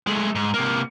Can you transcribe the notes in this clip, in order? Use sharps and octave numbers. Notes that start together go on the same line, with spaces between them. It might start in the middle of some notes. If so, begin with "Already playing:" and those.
G#3 A3
G#2
C3 A#3